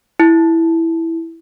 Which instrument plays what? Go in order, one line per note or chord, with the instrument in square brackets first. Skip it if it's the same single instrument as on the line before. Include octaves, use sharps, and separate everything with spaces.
[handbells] E4